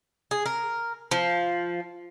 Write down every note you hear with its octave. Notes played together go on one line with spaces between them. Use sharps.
G#4
A#4
F3